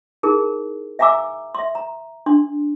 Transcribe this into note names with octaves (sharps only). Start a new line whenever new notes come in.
D#4 E4 G#4 A#4
E5 F5 G#5 A#5 D6 E6
E5 C6
A#5
D4 C6